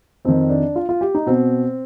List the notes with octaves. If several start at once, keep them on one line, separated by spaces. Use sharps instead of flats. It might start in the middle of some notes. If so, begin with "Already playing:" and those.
F2 D#3 C4
D4
F4
F4
G4
D#4
B2 C4